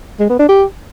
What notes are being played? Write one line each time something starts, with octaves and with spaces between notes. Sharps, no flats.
G#3
B3
D4
G4